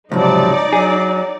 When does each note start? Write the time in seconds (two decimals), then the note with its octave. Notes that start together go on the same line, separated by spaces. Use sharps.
0.12 C#2 G#2 C3 F3 F#3 D#4 D5
0.73 F#3 G#4